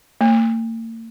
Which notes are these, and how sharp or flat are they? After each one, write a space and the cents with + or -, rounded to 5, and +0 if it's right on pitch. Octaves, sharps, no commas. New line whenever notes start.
A#3 -45